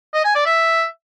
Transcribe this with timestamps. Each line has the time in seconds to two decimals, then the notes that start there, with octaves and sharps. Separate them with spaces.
0.14 D#5
0.24 G#5
0.35 D5
0.46 E5